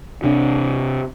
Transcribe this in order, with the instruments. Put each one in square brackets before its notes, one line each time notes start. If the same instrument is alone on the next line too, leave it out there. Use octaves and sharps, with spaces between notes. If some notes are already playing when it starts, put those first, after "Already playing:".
[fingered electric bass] C3 D4